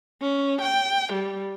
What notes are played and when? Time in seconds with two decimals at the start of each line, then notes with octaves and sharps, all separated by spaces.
0.21 C#4
0.61 G5
1.13 G3